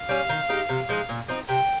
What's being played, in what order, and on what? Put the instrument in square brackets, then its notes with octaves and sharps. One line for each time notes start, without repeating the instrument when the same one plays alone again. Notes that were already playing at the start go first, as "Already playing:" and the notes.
Already playing: [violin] F5
[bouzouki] G3 C#4
D#3
G#3 D#4 G4
C3
F3 G#3 D#4
A#2
F3 C4 D#4
[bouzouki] C3 [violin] G5